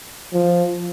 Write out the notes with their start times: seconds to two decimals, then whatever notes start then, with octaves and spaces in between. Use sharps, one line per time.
0.33 F3